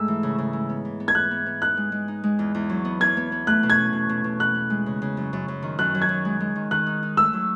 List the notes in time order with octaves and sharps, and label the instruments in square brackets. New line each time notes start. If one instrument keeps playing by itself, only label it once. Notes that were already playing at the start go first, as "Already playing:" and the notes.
Already playing: [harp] G#2 G#3 A3 [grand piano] E6
[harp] E3
C#3
C#3
G#3
B3
E3
B3
[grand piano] G#6
[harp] E3 [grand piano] F#6
[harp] B3
B3
[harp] D#4 [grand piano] F#6
[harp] G#3
G#3
D#4
G#3
E2
E2
F#3
B3
[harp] E2 [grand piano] G#6
[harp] B3
B3
[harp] A3 [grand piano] F#6
[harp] B2
[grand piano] G#6
[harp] C#4
B2
B2
B2
[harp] B3 [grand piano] F#6
[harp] B3
G#3
C#3
C#3
F#2
F#2
F#2
D#3
[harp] F#2 [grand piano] F#6
[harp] F#3
[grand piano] G#6
[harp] F#2
G#3
G#3
D#3
[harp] D#3 [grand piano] F#6
[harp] D#4
D#4
[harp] A3 [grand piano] E6
[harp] F#3